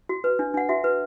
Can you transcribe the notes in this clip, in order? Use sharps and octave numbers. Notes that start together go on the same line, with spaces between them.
F#4
B4
D4
D4 F#5
F#4 E5
B4